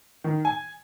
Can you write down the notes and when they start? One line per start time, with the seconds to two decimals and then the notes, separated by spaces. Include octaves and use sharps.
0.24 D#3
0.45 G#5